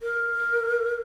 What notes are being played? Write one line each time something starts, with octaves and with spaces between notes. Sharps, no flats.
A#4